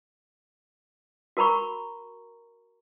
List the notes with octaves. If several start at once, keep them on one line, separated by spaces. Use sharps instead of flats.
F#4 A#4 A#5 B5 C#6